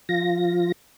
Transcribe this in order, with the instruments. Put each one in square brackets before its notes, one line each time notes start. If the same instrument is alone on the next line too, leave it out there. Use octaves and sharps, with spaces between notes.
[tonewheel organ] F3 F4 A#6